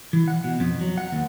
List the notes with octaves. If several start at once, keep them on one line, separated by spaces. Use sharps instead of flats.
E3
F#5
B2
F2
F#3
F#5
D#2